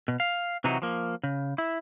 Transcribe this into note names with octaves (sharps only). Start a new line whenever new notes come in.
B2
F5
C3 E3 F#3 D#4 F#4
F3 A#3
C#3
E4